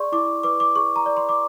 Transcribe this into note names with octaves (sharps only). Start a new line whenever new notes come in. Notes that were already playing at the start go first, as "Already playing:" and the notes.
Already playing: G#4 D5 C6 C#6
E4 D6
B4 D6
D6
G#4 C#6
A#5
D5
C6
D6